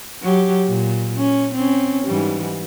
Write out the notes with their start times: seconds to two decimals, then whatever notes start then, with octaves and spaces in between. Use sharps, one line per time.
0.22 F#3 G4
0.68 A#2
1.17 C#4
1.54 C4 C#4
2.05 G#2 E3 G3